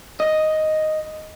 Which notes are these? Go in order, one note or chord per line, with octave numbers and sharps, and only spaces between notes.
D#5